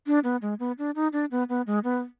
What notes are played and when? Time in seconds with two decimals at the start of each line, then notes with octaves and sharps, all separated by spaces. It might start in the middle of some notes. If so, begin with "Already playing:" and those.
0.07 D4
0.24 B3
0.42 G#3
0.60 B3
0.78 D4
0.95 D#4
1.13 D4
1.31 B3
1.49 B3
1.67 G#3
1.84 B3